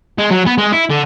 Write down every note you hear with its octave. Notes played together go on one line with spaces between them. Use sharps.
G#3
F#3
B3
G#3
E4
D3